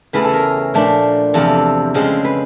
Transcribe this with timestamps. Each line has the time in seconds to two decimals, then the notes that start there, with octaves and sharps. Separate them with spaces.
0.13 E2 C#3 E3 A3 C#4 B4
0.24 A4
0.33 A#4
0.74 A#2 F3 A3 D4
1.34 E2 C3 F3 A4
1.94 F2 C#3 F3 G#3
2.25 B4